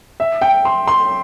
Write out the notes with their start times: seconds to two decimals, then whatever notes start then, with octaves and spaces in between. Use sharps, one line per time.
0.20 E5
0.42 G5
0.65 C6
0.87 C6